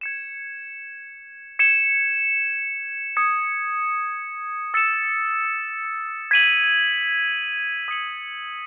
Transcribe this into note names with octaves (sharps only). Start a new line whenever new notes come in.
G#6 C#7 E7
G#6 C#7 E7
D#6 G#6 C#7
E6 A6 C#7 E7
G#6 B6 D#7 F#7
D#6 G#6 C#7 F#7